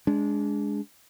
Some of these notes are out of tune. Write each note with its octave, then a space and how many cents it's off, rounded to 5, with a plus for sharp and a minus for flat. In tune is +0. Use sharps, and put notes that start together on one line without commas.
G#3 +0 D4 -25